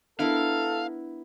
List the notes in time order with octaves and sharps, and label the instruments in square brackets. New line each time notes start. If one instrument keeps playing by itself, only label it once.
[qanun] B3 E4 A#4 [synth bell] D4 [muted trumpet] A4 [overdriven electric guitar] F5